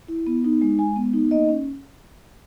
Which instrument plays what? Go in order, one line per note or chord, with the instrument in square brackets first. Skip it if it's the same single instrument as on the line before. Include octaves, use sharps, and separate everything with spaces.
[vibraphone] E4
B3
D#4
G#3
G#3 G#5
B3
D#4
A#3 D#5
C#4